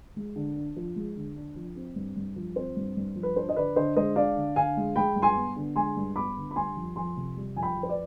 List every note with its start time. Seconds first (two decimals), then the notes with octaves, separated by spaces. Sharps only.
0.16 G#3
0.36 D3
0.56 D4
0.76 F3
0.96 G#3
1.16 D3
1.36 D4
1.56 F3
1.76 C4
1.96 G2
2.16 G2
2.36 F3
2.56 C4 C5
2.76 G2
2.97 G2
3.16 F3
3.23 B4
3.36 D4 C5
3.49 D#5
3.56 D3 B4 D5
3.76 D3 C5 D#5
3.96 G#3 C5 D#5
4.16 D4 D5 F5
4.36 D3
4.56 D3 F5 G#5
4.77 G#3
4.96 G#3 G5 B5
5.16 G2
5.22 G#5 C6
5.37 B3
5.56 D3
5.76 G#3 G#5 C6
5.96 G2
6.16 B3 B5 D6
6.36 D3
6.51 B5
6.56 G3 G#5 C6
6.76 F2
6.96 F2 G#5 C6
7.17 C3
7.37 G3
7.56 F2 G#5
7.62 G5 B5
7.77 F2
7.83 C5
7.89 B4 D5